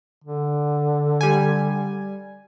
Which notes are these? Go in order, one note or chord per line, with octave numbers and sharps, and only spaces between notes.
D3
G3 G#5